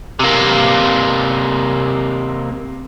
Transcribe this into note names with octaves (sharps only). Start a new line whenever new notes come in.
C3 A#3